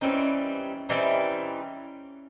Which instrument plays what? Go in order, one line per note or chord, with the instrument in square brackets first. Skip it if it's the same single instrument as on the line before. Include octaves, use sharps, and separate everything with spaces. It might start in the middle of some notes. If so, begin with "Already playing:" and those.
[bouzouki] E3 G3 C4 D#4 [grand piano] C#4
[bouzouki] E3 G3 C4 D#4